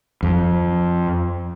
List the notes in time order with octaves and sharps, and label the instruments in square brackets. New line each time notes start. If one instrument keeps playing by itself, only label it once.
[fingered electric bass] F2